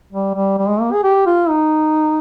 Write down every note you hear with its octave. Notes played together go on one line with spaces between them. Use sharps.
G3
G3
G3
G#3
A#3
G#4
G4
F4
D#4